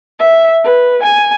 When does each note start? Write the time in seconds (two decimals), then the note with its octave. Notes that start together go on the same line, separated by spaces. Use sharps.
0.19 E5
0.64 B4
1.03 G#5